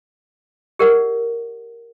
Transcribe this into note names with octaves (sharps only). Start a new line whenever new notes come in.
G4 A#4 D5 F#5